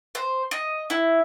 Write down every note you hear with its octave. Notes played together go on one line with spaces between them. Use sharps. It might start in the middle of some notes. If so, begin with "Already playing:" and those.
C5
D#5
E4